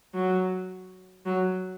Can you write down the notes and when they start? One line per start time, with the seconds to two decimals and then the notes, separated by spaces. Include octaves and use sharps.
0.14 F#3
1.26 F#3